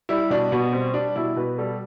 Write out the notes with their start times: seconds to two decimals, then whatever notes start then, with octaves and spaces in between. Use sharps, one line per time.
0.09 G3 E4
0.30 B2 D4
0.52 B2 B3
0.72 G3 C4
0.94 G3 D4
1.16 B2 E4
1.36 B2 B4
1.58 G3 A4